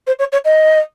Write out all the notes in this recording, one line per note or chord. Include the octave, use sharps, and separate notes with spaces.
C5
C#5
C#5
D#5